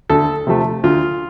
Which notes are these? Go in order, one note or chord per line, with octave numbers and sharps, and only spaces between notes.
D2 A4
C3 F3 A3
D2 F4